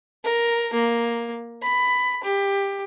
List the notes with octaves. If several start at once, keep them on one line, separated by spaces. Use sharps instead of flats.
A#4
A#3
B5
G4